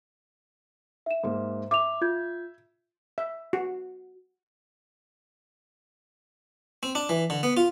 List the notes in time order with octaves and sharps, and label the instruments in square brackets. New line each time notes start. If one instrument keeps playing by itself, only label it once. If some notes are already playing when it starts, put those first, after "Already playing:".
[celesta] E5 E7
[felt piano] G#2 A#3
[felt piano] E5 [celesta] D6 F7
[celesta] F4 G6 G#6
[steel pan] E5
F#4
[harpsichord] C4
D4
E3
D3
B3
F4